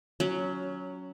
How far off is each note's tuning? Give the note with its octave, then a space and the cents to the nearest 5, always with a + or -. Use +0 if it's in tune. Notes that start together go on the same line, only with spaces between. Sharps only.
F#3 +0 C#4 +15